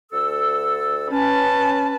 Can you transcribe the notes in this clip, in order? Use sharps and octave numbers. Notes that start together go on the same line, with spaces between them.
D2 A4 E6
C#4 B4 A5